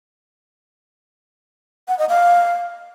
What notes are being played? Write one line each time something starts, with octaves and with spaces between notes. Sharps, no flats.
F#5
D#5
F5